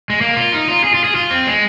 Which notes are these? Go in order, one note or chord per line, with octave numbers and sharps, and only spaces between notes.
G#3
A#3
F4
D#4
F4
G#4
F4
G#4
F4
C4
G#3